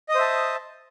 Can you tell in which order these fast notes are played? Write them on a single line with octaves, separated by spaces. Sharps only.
D#5 D#6 C5 E5 A5